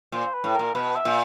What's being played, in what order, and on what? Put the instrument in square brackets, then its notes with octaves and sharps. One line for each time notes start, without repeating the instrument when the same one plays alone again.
[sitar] A#2 [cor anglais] C5
[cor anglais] B4
[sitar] A2
[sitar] A#2 [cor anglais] A#4
[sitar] B2 [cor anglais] B4
[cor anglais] E5
[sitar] A#2